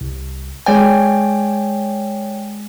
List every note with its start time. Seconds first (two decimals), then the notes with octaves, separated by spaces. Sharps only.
0.01 C2
0.66 G#3 C#5 D5 G5 G#5